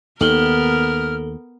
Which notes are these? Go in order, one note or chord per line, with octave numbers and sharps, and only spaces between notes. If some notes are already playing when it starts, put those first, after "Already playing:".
D#2 D#3 B3 A4 A#4 F6 F#7 G7